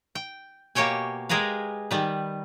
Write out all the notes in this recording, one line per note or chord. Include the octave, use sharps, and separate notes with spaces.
G5
B2 A#3 G4 C#5 G5 G#5
G#3 G4 G#4 A#4 B4 F5
D#3 G3 B4